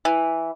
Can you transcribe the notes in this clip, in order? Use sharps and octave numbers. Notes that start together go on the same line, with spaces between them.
E3